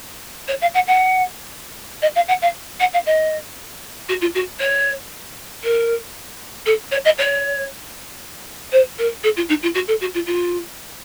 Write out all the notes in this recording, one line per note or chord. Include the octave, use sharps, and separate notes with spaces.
C#5
F5
F#5
F#5
D#5
F5
F#5
F5
F#5
F5
D#5
F#4
F4
F#4
C#5
A#4
A4
C#5
D#5
C#5
C5
A#4
A4
F4
D#4
F4
F#4
A4
F#4
F4
F4